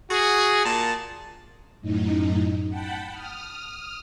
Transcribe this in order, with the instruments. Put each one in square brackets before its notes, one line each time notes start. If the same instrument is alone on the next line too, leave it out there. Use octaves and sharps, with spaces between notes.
[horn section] F#4 G#4
A#2 A#3 A5
[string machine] F#2 A2 D#4
F#5 G5 A5 B5
D#6 F6